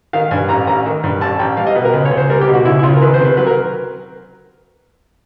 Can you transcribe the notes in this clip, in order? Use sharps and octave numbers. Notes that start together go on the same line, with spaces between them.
D#3 F5
G2 G#5
A1 A#5
A1 A#5
D#3
G2
A1 A5
A1 G5
G3 F5
D#5
B2 B4
A#4
C#2 B4
C#5
C#2
C5
G3 A#4
G4
B2
F#4
C#2 E4
E4
C#2 F4
A#4
D#3 B4
C5
C3
B4
F#3 B4
A#4